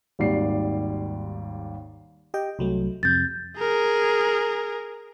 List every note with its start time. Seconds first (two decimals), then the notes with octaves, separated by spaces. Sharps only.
0.19 G#1 D#2 G3 D5 C7
2.34 G4 D#5 G5
2.59 C2 F#3 A3
3.03 F2 C3 G6 A6
3.59 G#4 A#4